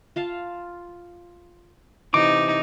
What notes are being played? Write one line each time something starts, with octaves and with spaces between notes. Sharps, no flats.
F4 F5 A5
C3 E3 D#4 D6